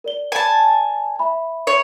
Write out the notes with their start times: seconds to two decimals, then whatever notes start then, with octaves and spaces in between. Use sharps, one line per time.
0.04 A#4 D5 G7
0.32 G#5 A5
1.19 E5 B5
1.67 C#5